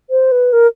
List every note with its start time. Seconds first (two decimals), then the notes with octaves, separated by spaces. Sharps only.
0.10 C5
0.32 B4
0.53 A#4